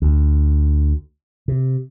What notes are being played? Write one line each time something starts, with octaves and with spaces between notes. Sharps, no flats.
D2
C3